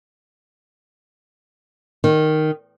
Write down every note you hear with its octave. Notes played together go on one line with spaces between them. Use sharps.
D#3